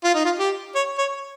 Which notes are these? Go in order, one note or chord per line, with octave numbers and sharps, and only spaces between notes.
F4
D#4
F4
G4
C#5
C#5